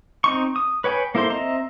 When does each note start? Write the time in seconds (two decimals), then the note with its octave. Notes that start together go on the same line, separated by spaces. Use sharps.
0.24 C4 D#4 C#6
0.56 D#6
0.84 B4 C#5 G5 G#5 B5
1.15 A#3 E4 A4 C5 C6
1.30 C4 D#5 E5 A#5